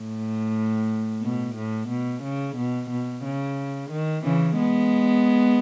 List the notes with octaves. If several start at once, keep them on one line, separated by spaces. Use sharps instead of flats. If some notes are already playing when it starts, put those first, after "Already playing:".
Already playing: A2
B2
A2
B2
C#3
B2
B2
C#3
D#3
C#3 E3
G#3 B3